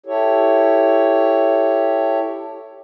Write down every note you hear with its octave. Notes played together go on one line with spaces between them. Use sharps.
E4 G4 A4 C#5